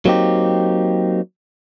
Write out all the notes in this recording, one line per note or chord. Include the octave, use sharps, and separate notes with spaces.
F#3 A#3 C4 D#4 G4